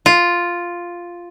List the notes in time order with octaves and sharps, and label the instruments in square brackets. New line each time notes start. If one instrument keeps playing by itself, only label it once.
[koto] F4